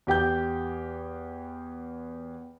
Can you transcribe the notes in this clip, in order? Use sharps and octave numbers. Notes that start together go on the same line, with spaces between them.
E2 G4 G5 G6